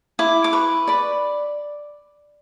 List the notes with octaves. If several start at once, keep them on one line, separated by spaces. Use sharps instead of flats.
E4 D6
D6
B4 C#6
D5 B5